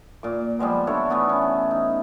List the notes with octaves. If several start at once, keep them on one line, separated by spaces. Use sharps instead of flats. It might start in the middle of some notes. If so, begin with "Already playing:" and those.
A#2 D6
F3 G3 G#3 B3
D4 E4 A4 C#5
E3 A3 B3 E4
C#4
D#4